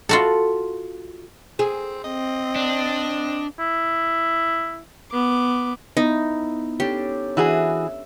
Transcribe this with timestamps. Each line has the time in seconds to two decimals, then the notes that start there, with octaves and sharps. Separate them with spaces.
0.09 F4 F#4 A4
1.59 C4 G#4
2.04 C4 D#5
2.56 D4
3.59 E4
5.12 B3 D6
5.97 B3 D#4 E4
6.80 C#4 D4 G4 A4
7.37 E3 F#4 G#4 E5